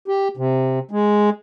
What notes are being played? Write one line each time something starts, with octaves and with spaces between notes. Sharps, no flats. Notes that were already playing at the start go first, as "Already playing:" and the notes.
G4
C3
G#3